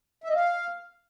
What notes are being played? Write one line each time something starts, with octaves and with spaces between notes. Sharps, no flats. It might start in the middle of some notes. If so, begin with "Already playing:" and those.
E5
D#5
F5